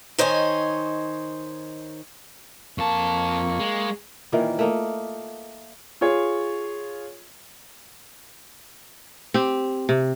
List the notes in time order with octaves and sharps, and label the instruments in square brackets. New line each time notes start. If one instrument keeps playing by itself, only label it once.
[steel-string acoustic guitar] D#3 C5 C#5 D#5 G#5
[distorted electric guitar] F2 A5 [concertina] A#3 C#6
[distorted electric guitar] G#3
[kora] A#2 D#3 E3 A#3
A3 A#3 D#5
[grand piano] F4 G#4 C#5
[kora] C4 G4
C3